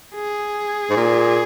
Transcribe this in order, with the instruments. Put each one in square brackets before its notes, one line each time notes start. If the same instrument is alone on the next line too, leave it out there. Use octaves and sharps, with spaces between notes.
[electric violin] G#4
[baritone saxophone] G#2
A#2